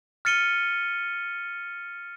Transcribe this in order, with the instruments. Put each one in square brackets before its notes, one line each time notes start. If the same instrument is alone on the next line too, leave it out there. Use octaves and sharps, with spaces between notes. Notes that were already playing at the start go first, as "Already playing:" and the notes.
[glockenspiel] F6 A6 C#7 D#7 G7